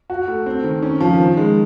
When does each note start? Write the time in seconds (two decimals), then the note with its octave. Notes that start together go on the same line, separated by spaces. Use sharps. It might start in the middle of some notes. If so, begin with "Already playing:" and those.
0.10 F#4
0.28 A3
0.46 C4
0.64 D#3
0.83 C#4
1.01 F3
1.18 D#3
1.37 G#3